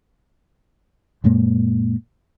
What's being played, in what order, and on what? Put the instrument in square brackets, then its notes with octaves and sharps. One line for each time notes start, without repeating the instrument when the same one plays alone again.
[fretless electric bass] F#2 A#2 G#3 A#3